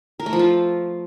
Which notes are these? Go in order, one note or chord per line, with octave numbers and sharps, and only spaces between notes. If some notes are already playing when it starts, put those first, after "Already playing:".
A#4
A3
F3
F4